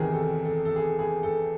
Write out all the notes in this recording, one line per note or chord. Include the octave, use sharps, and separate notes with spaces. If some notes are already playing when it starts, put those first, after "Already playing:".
Already playing: E2 C3 D#3 G#4 A#4
A4
A4
A4
G#4
G#4
A4